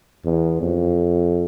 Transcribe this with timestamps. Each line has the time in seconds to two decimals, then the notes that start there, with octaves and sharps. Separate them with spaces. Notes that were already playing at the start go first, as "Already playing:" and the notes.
0.25 E2
0.62 F2